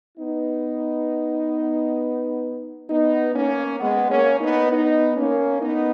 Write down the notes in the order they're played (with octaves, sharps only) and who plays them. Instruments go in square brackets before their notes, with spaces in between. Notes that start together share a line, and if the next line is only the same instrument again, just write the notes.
[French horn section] B3 D#4
B3 D#4
A#3 C#4
G#3 B3
A#3 C#4
B3 D#4
B3 D#4
A#3 C#4
B3 D#4